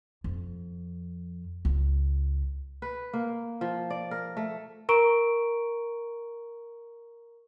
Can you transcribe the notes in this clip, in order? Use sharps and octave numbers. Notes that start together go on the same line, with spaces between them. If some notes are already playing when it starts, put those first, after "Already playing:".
F2
C#2
B4
A#3
F3
D5
A#4
A3
A#4 A#5 C#6 D7